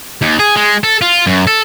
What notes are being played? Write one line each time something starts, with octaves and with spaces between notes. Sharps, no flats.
D#2
G#4
G#3
A4
F4
F#2
A4